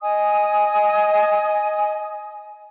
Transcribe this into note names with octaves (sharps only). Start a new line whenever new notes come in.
D#5 G#5 D#6